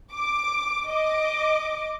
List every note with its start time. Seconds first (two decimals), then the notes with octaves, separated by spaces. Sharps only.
0.13 D6
0.89 D#5 D6